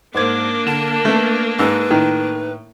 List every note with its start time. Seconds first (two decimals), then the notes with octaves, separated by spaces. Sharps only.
0.14 G#2 A#3 D4 C5 D6 G#6
0.66 D3 A5 E7
1.05 A3 B3
1.59 G#2 B4 E6
1.91 A2 D#3